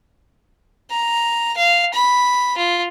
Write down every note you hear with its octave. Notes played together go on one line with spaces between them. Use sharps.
A#5
F5
B5
F4